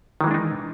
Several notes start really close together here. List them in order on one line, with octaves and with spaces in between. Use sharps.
D#3 E3 G#3 D4 D#4